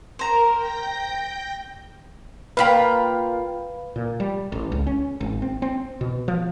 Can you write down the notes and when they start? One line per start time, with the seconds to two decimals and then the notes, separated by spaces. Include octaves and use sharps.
0.19 A#4 C5 A#5
0.52 G5 G6 A#6
2.57 A#3 F4 B4 F5 G5 B5
3.96 A#2
4.20 G3
4.52 A1
4.72 C#2
4.87 C#4
5.21 G#1
5.42 C4
5.62 C4
6.01 B2
6.28 F3